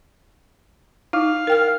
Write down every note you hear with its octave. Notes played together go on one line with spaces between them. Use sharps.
D#4 E4 F5
A#4 G5 F6